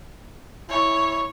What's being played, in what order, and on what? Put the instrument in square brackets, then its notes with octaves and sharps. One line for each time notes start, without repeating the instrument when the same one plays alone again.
[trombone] E4 [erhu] C#5